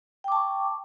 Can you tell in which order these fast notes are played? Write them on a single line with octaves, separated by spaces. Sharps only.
G5 D6 A5 C#6